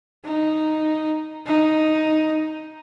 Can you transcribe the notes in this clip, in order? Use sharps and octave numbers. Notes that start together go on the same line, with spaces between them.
D#4
D#4